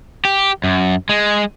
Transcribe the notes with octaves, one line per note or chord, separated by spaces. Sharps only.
G4
F#2
G#3